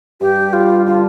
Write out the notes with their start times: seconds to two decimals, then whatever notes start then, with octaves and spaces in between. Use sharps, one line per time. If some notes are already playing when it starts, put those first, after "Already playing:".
0.21 G2 G4
0.53 G3 F4
0.86 D3 F4